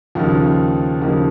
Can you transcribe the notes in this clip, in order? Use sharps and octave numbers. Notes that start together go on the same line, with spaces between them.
D#2 C#3 F3 A#3 D#4
D#2 C#3 F3 A#3 D#4